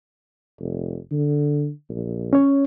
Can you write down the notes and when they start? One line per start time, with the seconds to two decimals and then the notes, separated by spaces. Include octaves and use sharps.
0.60 F1
1.12 D3
1.89 A#1
2.33 C#4 C#5